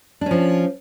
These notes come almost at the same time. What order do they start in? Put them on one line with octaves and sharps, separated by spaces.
D4 C#4 F3